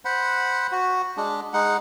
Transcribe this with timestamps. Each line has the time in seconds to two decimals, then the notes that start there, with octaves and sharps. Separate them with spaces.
0.05 C5 F#5 B5
0.72 F#4
1.17 G#3 D4
1.53 G#3 D#4 F#5